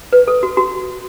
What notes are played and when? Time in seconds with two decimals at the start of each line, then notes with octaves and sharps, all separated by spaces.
0.13 B4
0.28 A4
0.43 F#4
0.57 F#4